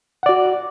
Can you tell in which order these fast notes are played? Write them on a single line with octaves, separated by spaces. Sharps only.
F#5 D5 F#4